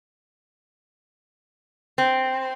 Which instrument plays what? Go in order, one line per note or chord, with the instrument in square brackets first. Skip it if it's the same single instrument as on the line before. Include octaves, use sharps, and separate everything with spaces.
[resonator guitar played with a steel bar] C4